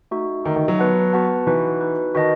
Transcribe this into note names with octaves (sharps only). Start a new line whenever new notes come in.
A3 D#4 F#4
D#3 A3 D#4 F#4
D#3
F#3
B3 F#4 B4 F#5 A5
B3 F#4 B4 F#5 A5
E3 D#4 F#4 B4
D#4 F#4 B4
D#3 F#4 B4 D#5 A5